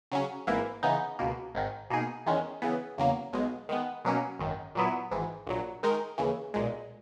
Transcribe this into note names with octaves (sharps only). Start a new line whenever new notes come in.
C#3 F#3 C#4
G#1 G#2 E3 A#3 E4
C#3 E3 B3 D#4
C#2 B2 A#3
G#1 G#2 D#3
B2 A#3 D#4 G#4
E2 D#3 G#3 C#4
C#3 E3 B3
E2 C#3 F#3 A#3
B1 B2 G#3
D#3 G#3 B3
B2 F#3 A#3 C#4
G#1 F#2 D#3
A#2 F#3 B3 E4
G#1 G#2 E3
A#1 A#2 F#3
D#3 G#3 D#4 A#4
D#2 C#3 E3
B1 A#2 G#3